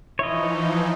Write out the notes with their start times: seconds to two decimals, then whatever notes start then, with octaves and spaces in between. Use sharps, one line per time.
0.19 E3 F3 D#4 E4 C#5 D#5